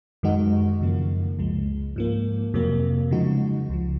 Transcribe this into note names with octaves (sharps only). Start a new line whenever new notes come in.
F#2 D#3 G#3 D#4 F#4
F#2 C#3 F3 A#3
C#2 C#3 F3 G#3
G#2 F3 A#3
F2 C3 F#3 A#3
C#3 F3 G#3 D#4 F#4
C#2 C#3 F3